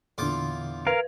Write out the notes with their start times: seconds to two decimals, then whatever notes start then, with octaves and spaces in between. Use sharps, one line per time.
0.18 E2 A#2 D3 F4 D6
0.87 A#4 B4 F5